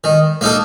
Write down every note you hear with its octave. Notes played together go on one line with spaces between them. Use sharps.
D#3
A#3 D#4 A4